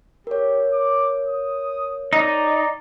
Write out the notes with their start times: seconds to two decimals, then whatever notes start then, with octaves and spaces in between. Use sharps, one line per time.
0.27 G4 A#4 C#5
0.73 D6
1.27 D#6
2.13 D#4 D5